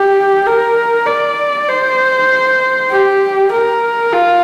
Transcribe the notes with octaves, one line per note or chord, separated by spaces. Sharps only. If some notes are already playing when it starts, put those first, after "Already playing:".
Already playing: G4
A#4
D5
C5
G4
A#4
F4